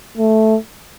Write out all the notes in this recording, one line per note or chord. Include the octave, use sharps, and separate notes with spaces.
A3